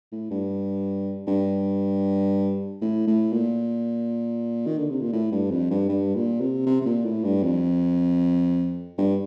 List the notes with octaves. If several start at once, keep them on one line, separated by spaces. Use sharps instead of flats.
A2
G2
G2
A2
A2
A#2
D#3
D3
C3
A#2
A2
G2
F2
G2
G2
A#2
C3
C3
C3
A#2
A2
G2
F2
G2